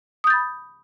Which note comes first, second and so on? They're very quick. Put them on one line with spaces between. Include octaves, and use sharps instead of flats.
D#6 G6 A6 B5